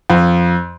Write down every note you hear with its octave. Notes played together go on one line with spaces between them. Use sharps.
F2